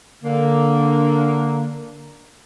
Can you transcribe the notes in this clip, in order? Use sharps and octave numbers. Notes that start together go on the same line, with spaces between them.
D3 A#3